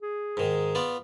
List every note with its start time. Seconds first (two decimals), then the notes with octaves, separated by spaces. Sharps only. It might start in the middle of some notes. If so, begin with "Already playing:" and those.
0.02 G#4
0.37 G#2 D#3
0.75 B3 F4 D5